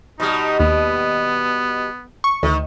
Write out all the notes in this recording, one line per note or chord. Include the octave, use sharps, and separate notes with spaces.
B2 G3 D#4
D#2 B3
C#6
D2 D#3